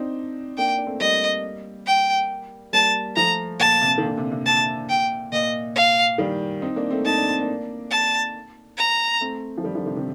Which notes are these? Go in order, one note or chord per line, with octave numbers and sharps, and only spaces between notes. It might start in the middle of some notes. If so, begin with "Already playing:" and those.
Already playing: C4 D4 D#4
A#3 D4 G5
D4
A3 C4
G3 A#3 D#5
G5
G3 A#3 A5
F3 A3 A#5
A#2 A5
C3
D#3
A#2 D3
C3
C3
A#2 A5
G5
A#2 D#5
F5
D#3 G3
C4 D#4
A#3 D4
A3 C4
D#4 A5
D4
C4
A#3 D4
A5
A#5
A3 C4
F3
D#3 G3
D3 F3
C3 D#3
C3 D#3